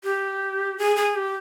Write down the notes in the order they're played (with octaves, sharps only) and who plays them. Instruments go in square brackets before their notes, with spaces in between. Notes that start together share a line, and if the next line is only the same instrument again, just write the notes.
[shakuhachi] G4
G#4
G#4
G4